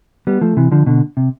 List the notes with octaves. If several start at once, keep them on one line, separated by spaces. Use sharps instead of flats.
G3 B3
F3 A3
C3 E3
D3 F3
B2 D3
C3